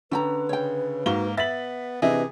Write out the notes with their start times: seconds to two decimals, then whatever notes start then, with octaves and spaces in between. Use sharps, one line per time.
0.11 D3 C#4 B4 G5 A#5
0.49 C#3 C#5 G5
1.06 G#2 A#3 D#4 F#4 F5 G7
1.37 B3 E5 A6 B6 F#7
2.02 C3 E3 D4 G#4 B4 D#5 E5